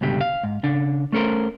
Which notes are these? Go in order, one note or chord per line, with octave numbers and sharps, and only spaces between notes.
C#2 G2 B2 D3 G4
F5
G#2
C#3 D4
A3 C#4 A4 A#4 C5